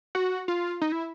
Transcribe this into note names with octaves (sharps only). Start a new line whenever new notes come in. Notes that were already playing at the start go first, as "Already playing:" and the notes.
F#4
F4
D#4
E4